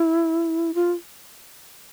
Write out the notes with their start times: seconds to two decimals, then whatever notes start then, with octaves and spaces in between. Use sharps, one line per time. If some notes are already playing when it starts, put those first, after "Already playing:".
Already playing: E4
0.74 F4